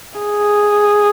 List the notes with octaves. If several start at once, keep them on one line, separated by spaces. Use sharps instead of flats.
G#4